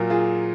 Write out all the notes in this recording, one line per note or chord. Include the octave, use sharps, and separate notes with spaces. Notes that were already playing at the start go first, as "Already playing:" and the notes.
Already playing: A#2 F#3 A#4
F4 G#4